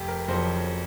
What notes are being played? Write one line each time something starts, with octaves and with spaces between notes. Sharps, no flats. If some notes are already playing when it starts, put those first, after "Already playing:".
Already playing: F1 G4
A#4
F2 C#3 F#3 C5